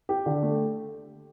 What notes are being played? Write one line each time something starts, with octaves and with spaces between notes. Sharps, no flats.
G4
D3
A3